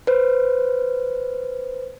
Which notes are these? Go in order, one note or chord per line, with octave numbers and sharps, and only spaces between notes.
B4 C5